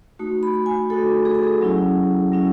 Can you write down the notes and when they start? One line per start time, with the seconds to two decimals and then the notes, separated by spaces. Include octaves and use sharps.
0.19 A3 D#4 F#4
0.43 B5
0.66 G#5
0.90 A3 D#4 F#4 A4
1.25 G#4
1.34 A4
1.44 G#4
1.61 F#3 C#4 E4
2.32 F#3 C#4 E4